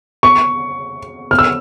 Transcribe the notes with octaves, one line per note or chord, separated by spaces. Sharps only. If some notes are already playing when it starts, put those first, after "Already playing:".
C#6
F6
E6